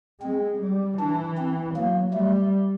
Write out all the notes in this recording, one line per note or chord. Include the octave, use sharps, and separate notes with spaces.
G#3 C4
G3
E3 D4
C4
F#3 A#3
G3 A3